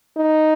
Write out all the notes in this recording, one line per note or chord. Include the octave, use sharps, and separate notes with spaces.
D#4